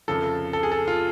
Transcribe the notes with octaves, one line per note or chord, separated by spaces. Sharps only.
F1 F2 C#3 F3 A4
A4
G#4
A4
F4